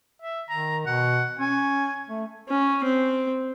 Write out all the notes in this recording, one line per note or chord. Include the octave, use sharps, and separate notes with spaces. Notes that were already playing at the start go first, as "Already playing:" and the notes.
E5
D#3 A#5
B2 F#5
C#4 G#5
A3
C#4
C4